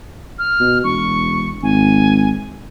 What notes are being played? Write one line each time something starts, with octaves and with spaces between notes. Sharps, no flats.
F6
B2
E1 C#6
G#1 G#5